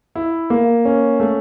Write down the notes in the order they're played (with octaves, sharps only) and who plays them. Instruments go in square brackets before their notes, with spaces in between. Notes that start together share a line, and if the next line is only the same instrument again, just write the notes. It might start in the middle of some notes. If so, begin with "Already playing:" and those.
[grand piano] E4
A#3
C#4
A3